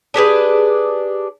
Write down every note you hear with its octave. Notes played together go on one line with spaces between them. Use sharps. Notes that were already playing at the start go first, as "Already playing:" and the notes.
D4 G4 G#4 B4